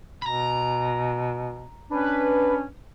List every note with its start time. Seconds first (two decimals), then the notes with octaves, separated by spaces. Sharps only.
0.22 B2 A#5 B5
1.91 C#4 D4 B4